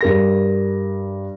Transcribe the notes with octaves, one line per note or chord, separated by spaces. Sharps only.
G2 A#4 A#6